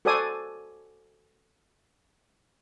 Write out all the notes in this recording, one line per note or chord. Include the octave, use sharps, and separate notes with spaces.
F#4 A4 C5 D5 G#5 D#6